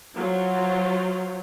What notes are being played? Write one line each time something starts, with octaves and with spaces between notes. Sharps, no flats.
F#3 F4 C5